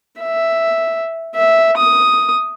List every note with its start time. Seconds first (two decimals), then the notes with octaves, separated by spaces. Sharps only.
0.20 E5
1.35 E5
1.77 D#6